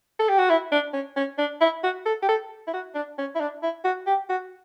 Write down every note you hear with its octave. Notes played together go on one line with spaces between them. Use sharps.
A4
G4
F#4
E4
D4
C#4
C#4
D4
E4
F#4
A4
G4
A4
E4
F#4
D4
C#4
E4
D4
E4
F#4
G4
F#4